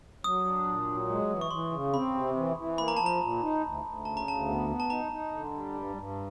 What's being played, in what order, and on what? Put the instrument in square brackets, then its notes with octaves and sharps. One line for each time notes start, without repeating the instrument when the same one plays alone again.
[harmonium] F#3 [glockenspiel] D#6
[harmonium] D4
A#2
F#3
G#3
E3
[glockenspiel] C#6
[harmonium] E3 [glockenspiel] C6
[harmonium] C#3
[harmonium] C4 [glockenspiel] B5
[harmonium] C3
E3
E3
[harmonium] A#3 [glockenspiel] B5
[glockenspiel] A#5
[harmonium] F3 [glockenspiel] A5
[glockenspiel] A#5
[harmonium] A#2
D#4
D2
D2
[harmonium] C#3 [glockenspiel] A5
[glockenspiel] A#5
[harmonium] D2 [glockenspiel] A5
[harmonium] B3
B3
[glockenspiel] A5
[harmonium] D#4 [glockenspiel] A#5
[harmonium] D#4
D3
G3
G2
G2